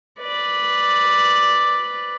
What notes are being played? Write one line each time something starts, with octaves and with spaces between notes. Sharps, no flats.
B4 D5